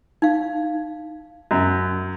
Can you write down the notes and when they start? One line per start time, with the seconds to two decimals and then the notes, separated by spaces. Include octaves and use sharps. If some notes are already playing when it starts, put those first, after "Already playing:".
0.22 D#4 F5
1.51 F#2